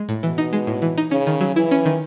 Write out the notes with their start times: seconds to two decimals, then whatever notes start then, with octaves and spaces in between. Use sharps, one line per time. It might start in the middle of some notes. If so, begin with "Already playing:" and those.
Already playing: G#3
0.09 A2
0.23 B2 E3
0.38 D#4
0.53 G#3
0.67 A2
0.82 E3
0.98 D#4
1.11 C#3 C#4
1.27 D#3
1.41 F#3
1.56 E3 E4
1.71 C#4
1.85 D#3